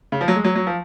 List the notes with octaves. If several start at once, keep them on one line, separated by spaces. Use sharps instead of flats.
C#3
F3
F#3
G#3
F#3
F#3
F3